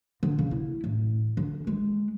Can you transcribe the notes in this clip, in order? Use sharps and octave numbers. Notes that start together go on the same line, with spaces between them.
D3
C#3
E4
A1
D3
G#3